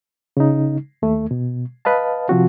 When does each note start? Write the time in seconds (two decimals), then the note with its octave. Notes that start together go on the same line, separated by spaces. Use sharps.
0.37 C#3 D#4
1.02 D#2 A3
1.31 B2
1.85 B4 D#5 F5 A5
2.29 C3 F3 C4 F#4